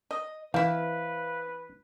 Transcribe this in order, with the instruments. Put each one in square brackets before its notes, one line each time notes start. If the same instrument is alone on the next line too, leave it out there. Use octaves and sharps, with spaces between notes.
[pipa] D#5
[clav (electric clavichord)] E3 [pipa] C4 E4 [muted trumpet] B4 [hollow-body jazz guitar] F5